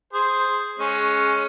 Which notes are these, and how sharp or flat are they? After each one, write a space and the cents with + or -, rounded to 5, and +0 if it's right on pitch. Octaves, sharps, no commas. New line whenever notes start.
G#4 +0 C5 +0
G#3 +20 C#4 +0